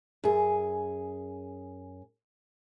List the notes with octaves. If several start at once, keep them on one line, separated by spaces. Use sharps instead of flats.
F#2 G#4